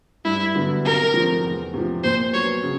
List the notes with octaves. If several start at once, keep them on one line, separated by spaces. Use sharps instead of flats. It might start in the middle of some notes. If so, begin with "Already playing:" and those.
G2 E4
D3 F#3 B3 E4
C3 A#4
F3 A3 C4
E2
C3 F3
A#2 C5
F#3 B3 C#5
C#3